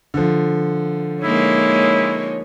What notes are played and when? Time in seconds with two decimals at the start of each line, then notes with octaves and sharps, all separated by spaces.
0.14 D3 F3
1.24 G#3 A#3 D#4 E4 C#5